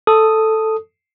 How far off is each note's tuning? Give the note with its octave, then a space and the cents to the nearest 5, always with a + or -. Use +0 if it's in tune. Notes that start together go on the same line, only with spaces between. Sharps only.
A4 +0 D#6 +0